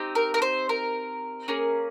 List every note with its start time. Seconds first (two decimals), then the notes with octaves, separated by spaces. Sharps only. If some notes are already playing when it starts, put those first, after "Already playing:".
Already playing: C4 D#4 G4
0.15 A#4
0.34 A#4
0.42 C5
0.69 A#4
1.48 A#3 C#4 G#4